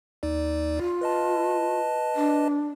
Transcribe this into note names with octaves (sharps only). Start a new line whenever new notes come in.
D#2 D#4 D5
F4
B4 D#5 A5
D4